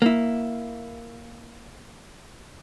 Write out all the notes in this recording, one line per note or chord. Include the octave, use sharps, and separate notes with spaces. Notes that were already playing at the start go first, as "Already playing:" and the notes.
A#3 E4